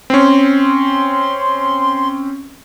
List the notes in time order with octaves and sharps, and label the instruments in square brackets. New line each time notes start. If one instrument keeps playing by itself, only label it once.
[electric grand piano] C4 C#4 [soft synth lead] C6